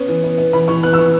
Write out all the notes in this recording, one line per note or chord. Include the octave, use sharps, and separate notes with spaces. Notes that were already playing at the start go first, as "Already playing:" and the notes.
Already playing: B3 C#4
E3
B3
B3
E3 B5
E3 C#6
B3 F#6
E6
E3 C#6